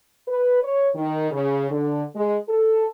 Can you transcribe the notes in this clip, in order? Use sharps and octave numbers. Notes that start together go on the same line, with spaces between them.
B4
C#5
D#3
C#3
D3
G#3
A4